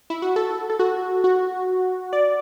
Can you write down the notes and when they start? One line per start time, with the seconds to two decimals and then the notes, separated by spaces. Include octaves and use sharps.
0.10 E4
0.22 F#4
0.36 A4
0.70 A4
0.79 F#4
1.24 F#4
2.13 D5